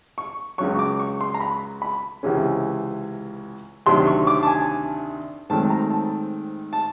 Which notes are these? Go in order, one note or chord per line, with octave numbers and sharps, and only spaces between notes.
C#6
C#2 C#3 F#3 C#6
D6
C#6
C6
A#5
B5
B5
C#2 C3 E3 G#3 C#4
D2 C3 D#3 F#3 C6
C#6
D6
A5
G#5
G#2 D#3 F#3 A3 C4 A5
A#5
A5
A5